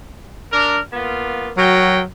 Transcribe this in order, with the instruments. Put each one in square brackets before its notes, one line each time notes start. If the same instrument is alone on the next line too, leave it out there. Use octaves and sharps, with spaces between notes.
[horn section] D4 A#4
A#3 B3 F4
[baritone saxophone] F#3 [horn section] F#4 A#4 G5